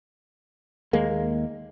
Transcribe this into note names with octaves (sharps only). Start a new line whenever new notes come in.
D#2 G#3 A#3